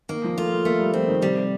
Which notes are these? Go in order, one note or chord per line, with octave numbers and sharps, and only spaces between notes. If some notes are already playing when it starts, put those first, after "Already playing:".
D#3 A#3
F3
A3 F4
A3
A3 A#3
G3
F3 C4
D#3
C3 G3